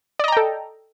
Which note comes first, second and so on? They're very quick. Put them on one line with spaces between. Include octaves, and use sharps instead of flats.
D5 D#5 A#5 G5 A4